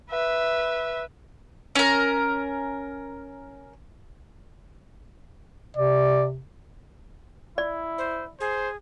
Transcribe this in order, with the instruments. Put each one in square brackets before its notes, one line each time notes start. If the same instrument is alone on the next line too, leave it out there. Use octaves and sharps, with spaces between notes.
[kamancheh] B4 E5
[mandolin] C#4 A#4
[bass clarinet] C3 [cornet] D5
[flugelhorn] E4 [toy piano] D5
[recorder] C5
[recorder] G#4 [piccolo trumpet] C5